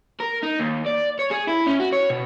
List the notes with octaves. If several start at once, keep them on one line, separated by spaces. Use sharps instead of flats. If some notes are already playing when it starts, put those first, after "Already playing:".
A#4
D#4
D#2
D5
C#5
G#4
E4
C#4
F#4
C#5
B2